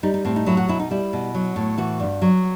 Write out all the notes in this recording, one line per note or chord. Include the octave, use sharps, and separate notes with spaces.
G3 D#4
D#4
A2 C4
D#4
F#3 E4
F#4
B2 E4
D#4
G3 E4
B2
F#3
A2
E3 F#4
G2
F#3